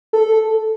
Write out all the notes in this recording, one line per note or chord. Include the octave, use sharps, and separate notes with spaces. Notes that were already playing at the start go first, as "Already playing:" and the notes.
A4